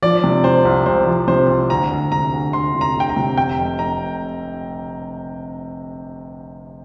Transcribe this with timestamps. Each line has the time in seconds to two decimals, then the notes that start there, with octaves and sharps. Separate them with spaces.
0.02 F3 D5
0.24 C3
0.44 C3 C5
0.65 C2
0.86 C2 C5
1.07 F3
1.28 C3 C5
1.49 C2
1.70 D2 A#5
1.91 D2
2.11 C3 A#5
2.33 D2
2.53 D2 C6
2.74 C3
2.81 A#5
2.95 D2 G5
3.09 A#5
3.16 C3
3.37 F1 G5
3.58 F1
3.79 F1 A#5